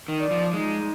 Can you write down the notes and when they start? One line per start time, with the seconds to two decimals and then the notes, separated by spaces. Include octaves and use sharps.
0.08 D#3
0.20 D5
0.31 F3
0.54 G#3 D#4